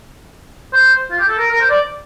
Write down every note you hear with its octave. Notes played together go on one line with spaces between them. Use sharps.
C5
F4
G4
A4
A#4
A#4
C5
D5